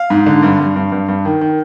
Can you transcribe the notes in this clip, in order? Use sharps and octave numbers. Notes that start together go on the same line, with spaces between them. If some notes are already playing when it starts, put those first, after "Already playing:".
Already playing: F5
G#2
D3
G2
G2
G2
G2
G2
D#3
D#3